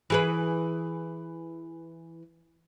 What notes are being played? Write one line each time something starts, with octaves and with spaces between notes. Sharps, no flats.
E3 G#4 B4